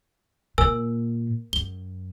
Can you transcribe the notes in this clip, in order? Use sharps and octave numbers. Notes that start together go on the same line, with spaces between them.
A#2 A#4 G#5 E6
F#2 G7